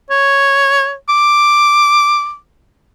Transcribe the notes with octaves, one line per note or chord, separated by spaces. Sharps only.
C#5
D6